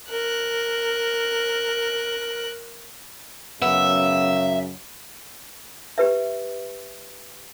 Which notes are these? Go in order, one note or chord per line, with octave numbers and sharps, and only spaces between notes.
A#4 F#6
F#2 C#3 B3 E5
G4 B4 E5